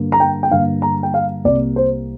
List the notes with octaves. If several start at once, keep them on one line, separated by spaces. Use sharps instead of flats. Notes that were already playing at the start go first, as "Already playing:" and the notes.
Already playing: G2 D3 A#3
A#5
G5
G5
G2 D3 A#3 F5
A#5
G5
F5
C2 C3 A#3 D5
C5